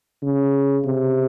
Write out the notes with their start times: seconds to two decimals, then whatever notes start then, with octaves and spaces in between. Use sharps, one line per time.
0.23 C#3
0.85 C3